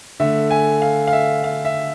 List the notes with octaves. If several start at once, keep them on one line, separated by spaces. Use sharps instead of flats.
D3 A3 E5
G#5
F5
F5
E5
F5
E5